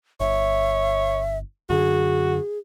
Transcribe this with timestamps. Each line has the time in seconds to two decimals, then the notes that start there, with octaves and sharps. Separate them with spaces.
0.20 G1 C#5 E5
1.70 F#2 D3 F#4 G#4